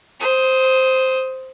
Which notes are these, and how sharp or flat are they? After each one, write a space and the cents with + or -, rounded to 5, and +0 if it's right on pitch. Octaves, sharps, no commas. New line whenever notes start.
C5 +0 D#6 +20